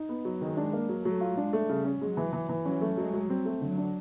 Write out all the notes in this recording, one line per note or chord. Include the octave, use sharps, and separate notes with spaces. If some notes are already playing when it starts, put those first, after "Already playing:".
Already playing: D#4
B3
F#3
D#3 G#3
D4
A#3
F#3
F#3 A3
F4
G#3 D4
A3
C#3 G3
C#4
F#3 G#3
E3
E3
E3
F#3 C#4
A3
F#3 G#3
F#3
G3 C4
A3
D3 F#3
D4